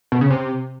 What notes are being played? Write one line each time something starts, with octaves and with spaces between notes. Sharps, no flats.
B2
C#3
C3